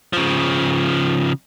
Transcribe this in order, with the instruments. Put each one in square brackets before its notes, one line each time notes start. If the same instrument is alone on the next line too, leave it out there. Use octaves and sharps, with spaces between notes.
[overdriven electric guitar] C#3 F3